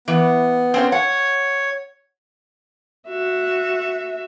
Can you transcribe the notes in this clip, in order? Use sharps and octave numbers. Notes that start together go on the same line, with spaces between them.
E3 B3
C4 C#4 C5
C#5 F#5
F#4 E5